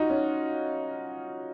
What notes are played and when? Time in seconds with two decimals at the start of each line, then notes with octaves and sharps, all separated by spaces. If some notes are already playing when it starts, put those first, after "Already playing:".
Already playing: D#4 F4 F#4
0.10 C#4